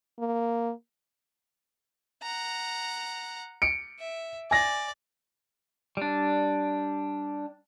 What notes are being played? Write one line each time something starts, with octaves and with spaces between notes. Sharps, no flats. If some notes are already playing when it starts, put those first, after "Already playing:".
A#3
F#5 A#5
C#7 D7
E5
D5 G#5 A#6
G3 D4